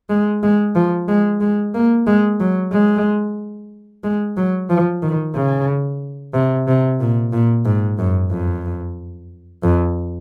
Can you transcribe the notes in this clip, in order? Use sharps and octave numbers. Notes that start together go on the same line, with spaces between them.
G#3
G#3
F3
G#3
G#3
A#3
G#3
F#3
G#3
G#3
F#3
F3
D#3
C#3
C3
C3
A#2
A#2
G#2
F#2
F2
F2